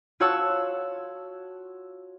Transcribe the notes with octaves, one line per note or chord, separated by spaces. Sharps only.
F4 F#4 C#5 F#5 A5 E6